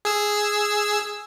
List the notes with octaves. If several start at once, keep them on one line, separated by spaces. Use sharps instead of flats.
G#4 E6